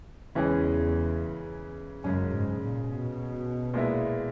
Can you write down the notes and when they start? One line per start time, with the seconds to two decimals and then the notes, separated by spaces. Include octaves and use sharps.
0.35 E2 C#3 E3 G#3 C#4 G#4
2.04 F#2 C#3 G#3 C#4
2.32 G#2
2.60 A#2
2.89 B2
3.74 A#2 G#3 B3 E4